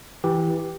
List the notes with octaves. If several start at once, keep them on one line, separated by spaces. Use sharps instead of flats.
E3 G4